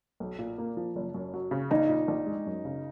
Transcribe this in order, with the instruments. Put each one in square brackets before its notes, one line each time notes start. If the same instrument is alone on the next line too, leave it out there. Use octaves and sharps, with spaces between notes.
[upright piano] B1
A#2
A#3
F3
F#1
F#2
F#3
C#3
[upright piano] A#1 [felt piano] D#4
[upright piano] A#2
A#1
G#3
F#2
C#3